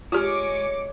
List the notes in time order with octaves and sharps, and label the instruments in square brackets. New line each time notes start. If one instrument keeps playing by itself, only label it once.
[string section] G#3 D6 C#7 [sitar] C#4 [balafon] F4 G4